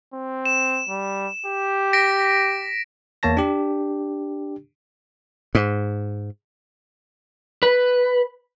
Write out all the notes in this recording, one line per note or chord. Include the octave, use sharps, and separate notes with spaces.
C4
E7
G3
G4
A#6 B6 D7
E2 A#3 C#5 A5 A#6
D4 G4
G#2
B4